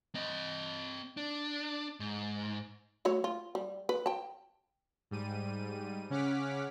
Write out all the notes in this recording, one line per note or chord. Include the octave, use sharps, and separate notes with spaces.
C4 D#5
D4
G#2
F#3 A3 C#5
F4
G3
B4
G5 A5
G#2 G3 D#7
C#3 C#4 F#5 D6 F6 B6